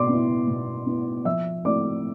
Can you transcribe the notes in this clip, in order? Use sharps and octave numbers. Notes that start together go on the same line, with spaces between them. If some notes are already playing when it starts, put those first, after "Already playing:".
Already playing: B2 D5 C6 D6
B3 E4
B2
B3 E4
F3 E5 E6
A3 C4 E4 D5 D6